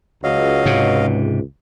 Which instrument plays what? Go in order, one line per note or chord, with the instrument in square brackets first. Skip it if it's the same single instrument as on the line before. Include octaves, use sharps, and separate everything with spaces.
[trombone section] C#2 [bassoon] F#3 [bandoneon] D#5 F5
[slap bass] G#2 C3